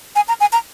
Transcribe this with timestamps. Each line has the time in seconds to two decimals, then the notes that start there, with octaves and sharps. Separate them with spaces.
0.16 G#5
0.28 A#5
0.40 G#5
0.53 A#5